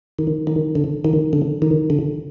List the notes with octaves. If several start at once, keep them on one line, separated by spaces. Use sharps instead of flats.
D#3
D#3
D3
D#3
D3
D#3
D3